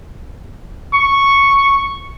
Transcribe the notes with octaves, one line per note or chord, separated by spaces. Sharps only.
C#6